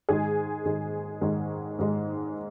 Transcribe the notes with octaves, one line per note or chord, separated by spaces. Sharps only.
G#2 D#3 G#3 G#4
G#2 D#3 G#3
G#2 D#3 G#3
G#2 D#3 G#3